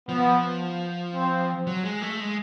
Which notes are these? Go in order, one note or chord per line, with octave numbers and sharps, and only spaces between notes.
F3 B3
C4
F#3
G#3
A3
G#3